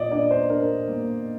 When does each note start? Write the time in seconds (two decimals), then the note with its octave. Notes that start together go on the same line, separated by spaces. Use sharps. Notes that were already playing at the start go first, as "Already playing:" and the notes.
Already playing: A#2 D5 D#5
0.11 D4 D5
0.31 C5
0.50 D4 A#4
0.88 A#3